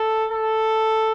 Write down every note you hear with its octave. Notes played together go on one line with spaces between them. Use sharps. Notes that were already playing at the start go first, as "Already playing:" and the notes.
Already playing: A4
A4